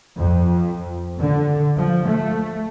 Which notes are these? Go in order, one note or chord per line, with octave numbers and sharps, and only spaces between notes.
F2
D3
F3
A3